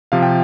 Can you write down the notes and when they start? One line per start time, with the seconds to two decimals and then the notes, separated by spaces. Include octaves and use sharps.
0.12 C3 F3 F5
0.23 G5